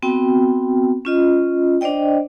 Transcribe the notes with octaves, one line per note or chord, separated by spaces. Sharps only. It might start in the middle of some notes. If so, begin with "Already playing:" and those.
B3 C4 F#4 G5
C#4 F4 D#5
D4 C5 D5 D#5 G5